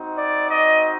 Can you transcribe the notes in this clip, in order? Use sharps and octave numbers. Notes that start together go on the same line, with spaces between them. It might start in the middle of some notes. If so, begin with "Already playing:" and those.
Already playing: C4 D#4 F#4
D5
D#5